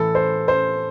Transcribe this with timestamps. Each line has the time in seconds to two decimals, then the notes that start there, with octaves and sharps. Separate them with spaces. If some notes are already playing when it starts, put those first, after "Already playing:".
Already playing: A2 E3 A4
0.15 C5
0.48 C5